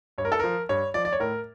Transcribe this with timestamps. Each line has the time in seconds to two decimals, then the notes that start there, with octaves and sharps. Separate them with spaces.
0.18 G2 C#5
0.25 A#4
0.32 A4
0.39 F3 A#4
0.69 G2 C#5
0.94 F3 D5
1.05 D5
1.13 C#5
1.20 A2 A#4